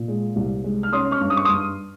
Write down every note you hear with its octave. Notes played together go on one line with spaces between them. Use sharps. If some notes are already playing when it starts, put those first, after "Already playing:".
Already playing: A#2
G#3
C2
G#3
F6
C#4 C6 D#6
C#6 F6
G2
D#6
C#6
G2 C6 D#6